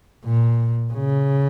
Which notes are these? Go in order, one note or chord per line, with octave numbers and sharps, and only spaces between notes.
A#2
C#3